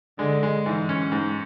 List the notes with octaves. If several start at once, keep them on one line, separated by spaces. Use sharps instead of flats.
D3 G#3
G#3
G#2 E3
C#4
G#2 G#3